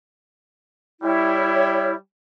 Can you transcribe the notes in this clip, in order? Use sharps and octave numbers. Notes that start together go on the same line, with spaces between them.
G3 E4 C#5